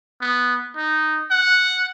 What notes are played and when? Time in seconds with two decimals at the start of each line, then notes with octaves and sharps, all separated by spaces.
0.21 B3
0.76 D#4
1.31 F#5